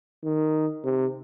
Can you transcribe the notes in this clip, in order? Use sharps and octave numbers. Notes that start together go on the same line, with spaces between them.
D#3
C3